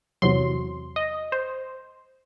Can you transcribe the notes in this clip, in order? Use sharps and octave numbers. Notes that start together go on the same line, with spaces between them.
E2 C3 F#3 C6
D#5
C5